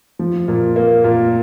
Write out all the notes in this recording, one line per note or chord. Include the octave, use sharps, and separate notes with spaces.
F3
A#2
A#3
A#2